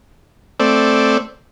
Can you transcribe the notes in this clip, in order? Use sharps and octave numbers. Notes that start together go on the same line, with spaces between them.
A3 C4 D5